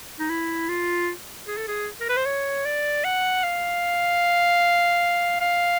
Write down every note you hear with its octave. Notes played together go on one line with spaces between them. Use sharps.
D#4
E4
F4
G#4
A4
G#4
A#4
B4
C5
C#5
D5
F#5
F5
F5